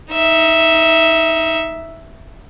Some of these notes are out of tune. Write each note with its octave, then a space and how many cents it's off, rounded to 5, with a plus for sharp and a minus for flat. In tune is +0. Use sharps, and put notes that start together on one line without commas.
D#4 +20 E5 +0